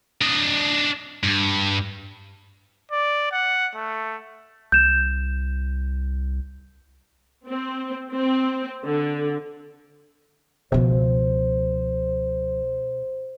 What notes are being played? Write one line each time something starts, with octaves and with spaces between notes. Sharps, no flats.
D4 D#5
G2
D5
F#5
A3
C2 G6 E7
C4
C4
D3
C#2 B2 F3 C5